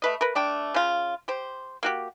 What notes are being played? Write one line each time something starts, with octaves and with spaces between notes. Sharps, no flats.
A3 B4 D#5
A#4 B4
A3 D4 G5
C#3 F4
G4 C5
A#3 F#4 G4